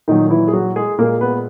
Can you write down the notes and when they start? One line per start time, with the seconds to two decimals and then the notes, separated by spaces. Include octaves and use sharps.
0.08 A#2 D#3 F#3 D#4
0.30 E3 E4
0.48 G#4
0.53 F#3 F#4
0.76 G#3 G#4
0.98 A#2 G#3 A#3 A#4
1.21 B3 B4